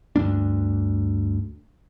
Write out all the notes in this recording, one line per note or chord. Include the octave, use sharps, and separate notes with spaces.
D2 G2 A#3 D4